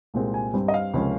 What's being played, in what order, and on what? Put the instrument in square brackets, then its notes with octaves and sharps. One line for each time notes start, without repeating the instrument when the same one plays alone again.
[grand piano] C2 A#2 G#3 C4
G#5
G2 G3 C4
D#5
F5
C#2 C3 F3 A#3 C#4